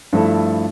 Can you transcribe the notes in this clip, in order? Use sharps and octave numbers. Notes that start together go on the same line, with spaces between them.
G2 F3 A3 E4 A4